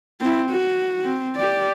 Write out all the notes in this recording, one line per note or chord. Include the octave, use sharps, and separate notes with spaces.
C4 E4
F#4
C4
G4 D5